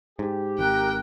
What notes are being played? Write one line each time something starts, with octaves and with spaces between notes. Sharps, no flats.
G#2 G4
G#1 A#4 G5 F#6